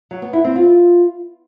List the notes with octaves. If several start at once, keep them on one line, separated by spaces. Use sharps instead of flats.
F#3
B3
E4
C4
F4